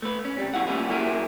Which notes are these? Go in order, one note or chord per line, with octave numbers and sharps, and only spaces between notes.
A3 B4
C#4
C3 G3
F2 C#3 E4 F5 F#5
A#2 G3 A3 C#4 E4
F#3 A#3 E4 G4 G#4 A#4